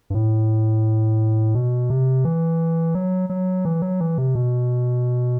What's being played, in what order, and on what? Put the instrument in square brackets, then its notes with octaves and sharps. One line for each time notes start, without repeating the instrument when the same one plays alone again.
[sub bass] G2
A2
B2
C3
E3
F#3
F#3
E3
F#3
E3
C3
B2